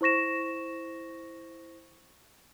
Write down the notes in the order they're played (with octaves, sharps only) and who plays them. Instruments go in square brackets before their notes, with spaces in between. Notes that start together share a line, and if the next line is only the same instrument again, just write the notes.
[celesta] E4 C5 C#6 A#6 E7